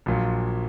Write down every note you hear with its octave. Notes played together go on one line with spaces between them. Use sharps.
A#1 A#2 F#3